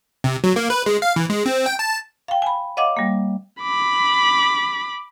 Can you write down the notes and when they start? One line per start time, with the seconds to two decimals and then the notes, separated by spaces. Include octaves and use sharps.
0.24 C3
0.44 F#3
0.56 A#3
0.70 B4
0.86 G#3
1.02 F5
1.16 E3
1.30 G#3
1.46 C4
1.66 G5
1.79 A5
2.28 F5 G5
2.42 G#5 B5
2.77 C#5 D#5 F5 F#5 D6
2.97 G3 A#3
3.61 B5 D6